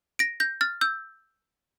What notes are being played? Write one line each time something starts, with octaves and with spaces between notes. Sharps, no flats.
A#6 D7
G6 A#6
F6 A6
E6 G6